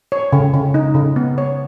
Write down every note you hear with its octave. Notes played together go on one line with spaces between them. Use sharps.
C#5
C#3
C#3
D#4
C#3
B3
C#5